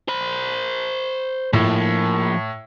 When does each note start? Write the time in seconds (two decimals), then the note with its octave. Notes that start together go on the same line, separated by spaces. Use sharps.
0.08 C5 B5
1.53 A2 F3 A#3